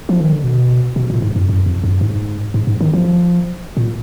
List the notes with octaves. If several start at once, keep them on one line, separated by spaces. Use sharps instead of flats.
F3
D#3
D3
B2
B2
A#2
G#2
F#2
F#2
F2
F#2
G#2
G#2
G#2
D#3
F3
A#2